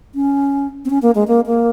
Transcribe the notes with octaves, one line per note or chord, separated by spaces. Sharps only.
C#4
C4
C#4
A#3
G#3
A#3
A#3